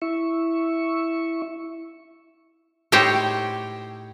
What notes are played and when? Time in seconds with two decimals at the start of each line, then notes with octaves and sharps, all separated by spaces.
0.02 E4 E5 C#6
2.92 A2 D#4 G4 C5 C#5